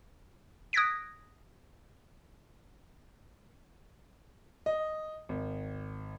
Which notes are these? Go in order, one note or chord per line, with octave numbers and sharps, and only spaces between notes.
D#6 F#6 G#6 A#6 B6 D7
D#5
G#1